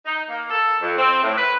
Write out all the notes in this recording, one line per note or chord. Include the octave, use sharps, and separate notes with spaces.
D#4
A#3
A4
F2
C4
A2
B4